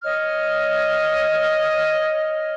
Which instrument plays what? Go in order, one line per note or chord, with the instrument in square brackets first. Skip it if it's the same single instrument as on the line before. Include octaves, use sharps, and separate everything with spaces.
[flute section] C#5 D#5 F6